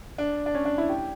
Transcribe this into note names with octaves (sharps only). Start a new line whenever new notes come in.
D4
D4
C#4
D4
E4
G4